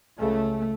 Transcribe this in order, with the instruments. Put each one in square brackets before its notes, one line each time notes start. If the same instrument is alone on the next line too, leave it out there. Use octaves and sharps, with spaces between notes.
[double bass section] C#2 C#3 A3